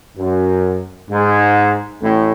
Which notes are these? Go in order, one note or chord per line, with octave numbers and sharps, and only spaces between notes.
F#2
G#2
A1 A2